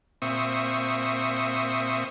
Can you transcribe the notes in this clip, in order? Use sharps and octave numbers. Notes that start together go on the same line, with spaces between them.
A#2 C4 E5 C#6 D#6